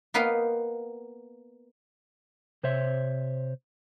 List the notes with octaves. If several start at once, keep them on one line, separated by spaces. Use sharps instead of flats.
A#3 B3 B4 D#5 F5 G5
C3 C5 C#5 E5